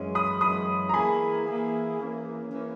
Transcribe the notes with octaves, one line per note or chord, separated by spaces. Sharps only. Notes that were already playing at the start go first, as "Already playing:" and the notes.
Already playing: F#2 E3 G#3 C#4
B5 D#6
F#2 E3 G#3 C#4 B5 D#6
A#5
E3 A#3 E4 G#4 G#5 B5
E3 A#3 E4 G#4
E3 A#3 C#4
E3 A#3 C#4